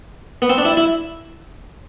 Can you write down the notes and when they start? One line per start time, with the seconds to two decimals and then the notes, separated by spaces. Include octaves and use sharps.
0.42 B3
0.50 C4
0.58 D4
0.65 E4
0.77 E4